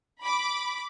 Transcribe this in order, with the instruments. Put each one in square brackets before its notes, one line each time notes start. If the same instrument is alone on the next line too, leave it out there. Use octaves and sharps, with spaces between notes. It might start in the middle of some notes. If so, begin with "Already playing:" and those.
[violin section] B5 D6